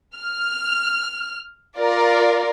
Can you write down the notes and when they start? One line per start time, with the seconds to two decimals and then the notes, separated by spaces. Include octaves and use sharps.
0.16 F6
1.78 F4 A#4 D5